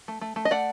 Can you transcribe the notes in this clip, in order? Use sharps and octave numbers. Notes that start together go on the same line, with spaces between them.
A3
A3
A3
D#5
A3 D5 F#5